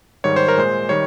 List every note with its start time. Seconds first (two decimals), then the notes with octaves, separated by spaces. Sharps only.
0.24 G#2 D#3 G3 C#5
0.36 C5
0.48 A#4
0.57 A#2 G#3 C5
0.89 D#3 G3 C#5